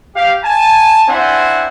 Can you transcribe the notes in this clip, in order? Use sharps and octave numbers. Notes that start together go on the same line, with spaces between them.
G4 F5
G#5 A5
C4 D4 E4 C5 F#5 G#5